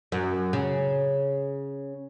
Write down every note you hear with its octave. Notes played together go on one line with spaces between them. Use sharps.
F#2
C#3